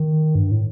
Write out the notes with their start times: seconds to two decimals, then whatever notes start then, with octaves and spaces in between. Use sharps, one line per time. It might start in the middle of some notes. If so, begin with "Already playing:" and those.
Already playing: D#3
0.35 G2
0.52 A2